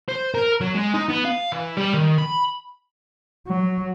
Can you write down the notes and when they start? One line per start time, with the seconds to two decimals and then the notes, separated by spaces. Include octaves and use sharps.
0.09 C5
0.35 A#4
0.61 F#3
0.75 G#3
0.94 D#4
1.09 B3
1.25 F5
1.52 E3
1.77 G3
1.94 D#3
2.18 B5
3.48 F#3